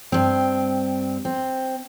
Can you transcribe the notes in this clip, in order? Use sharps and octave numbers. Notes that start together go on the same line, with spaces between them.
G2 C4
C4